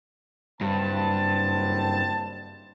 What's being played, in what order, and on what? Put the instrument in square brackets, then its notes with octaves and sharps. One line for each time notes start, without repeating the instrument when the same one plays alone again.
[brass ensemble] F#1 C4 A5 [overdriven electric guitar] G2